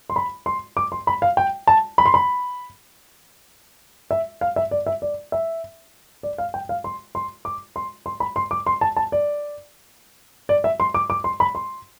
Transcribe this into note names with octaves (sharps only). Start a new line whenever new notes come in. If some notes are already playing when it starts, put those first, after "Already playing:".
C6
B5
C6
D6
C6
B5
F5
G5
A5
B5
C6
B5
E5
F5
E5
D5
E5
D5
E5
D5
F5
G5
F5
C6
C6
D6
C6
C6
B5
C6
D6
C6
A5
A5
D5
D5
E5
C6
D6
D6
C6
B5
C6